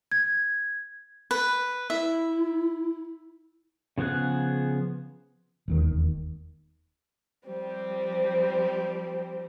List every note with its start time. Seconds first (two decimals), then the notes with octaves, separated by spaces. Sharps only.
0.11 G#6
1.31 B4
1.90 E4 E5
3.98 C#3 F3 B3 G#4 F#6
5.68 E1 D#2 D#3
7.47 F3 G3 C4 C5